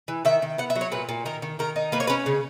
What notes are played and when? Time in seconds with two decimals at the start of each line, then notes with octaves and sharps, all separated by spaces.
0.08 E3
0.25 D#3 E5
0.42 D#3
0.58 B3 F#5
0.70 E5
0.75 F#3
0.81 C#5
0.92 A#2 B4
1.09 A#2
1.26 D#3 A#4
1.42 D#3
1.59 D#3 A#4
1.76 D#4
1.92 A#3 B4
2.00 C#5
2.07 C#4 B4
2.26 C#3